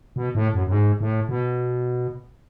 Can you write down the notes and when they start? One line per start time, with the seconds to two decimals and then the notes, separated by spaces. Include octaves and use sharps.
0.16 B2
0.35 A2
0.54 F#2
0.67 F#2
0.72 G#2
1.01 A2
1.29 B2